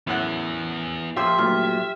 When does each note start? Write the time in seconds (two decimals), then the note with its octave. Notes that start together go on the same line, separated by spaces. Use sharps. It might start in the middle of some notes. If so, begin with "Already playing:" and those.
0.07 F#2 A2 B3 E4 F#5
1.16 A#2 F3 F4 G4 E5 C6 E6
1.38 G2 A#2 F#3 A3 F6 B6